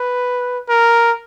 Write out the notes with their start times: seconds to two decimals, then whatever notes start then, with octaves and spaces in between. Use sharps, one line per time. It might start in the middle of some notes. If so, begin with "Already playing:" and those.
Already playing: B4
0.69 A#4